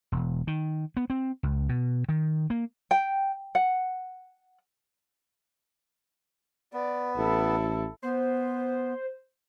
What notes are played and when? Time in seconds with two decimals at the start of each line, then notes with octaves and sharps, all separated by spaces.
0.12 E1
0.47 D#3
0.97 B3
1.10 C4
1.43 C#2
1.69 B2
2.09 D#3
2.50 A#3
2.91 G5
3.55 F#5
6.73 B3 D5
7.16 A1 E4 A4
8.03 B3 C5